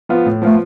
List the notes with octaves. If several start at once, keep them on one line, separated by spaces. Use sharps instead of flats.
F3 B3 F4
A2
F3 A3 B3 F4